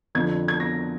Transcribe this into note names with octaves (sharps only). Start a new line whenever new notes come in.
F2 D3 F3 G#6
G#6
A#6